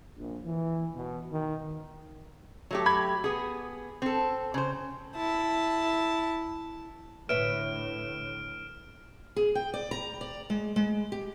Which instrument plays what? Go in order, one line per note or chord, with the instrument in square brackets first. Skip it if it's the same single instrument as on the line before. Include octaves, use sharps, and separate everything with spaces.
[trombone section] A#1
E3
B2
D#3
[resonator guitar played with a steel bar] F#3 A3 G4
[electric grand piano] B5 G#6
[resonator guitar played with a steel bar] B3 G#4
C4 A4
C#3 C5
[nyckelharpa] E4 A5
[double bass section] A2 D3 [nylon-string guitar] B4 C#5 E5 [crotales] F6 D7 E7
[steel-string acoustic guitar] G#4
G5
D5
A#5
D5
G#3
G#3
G4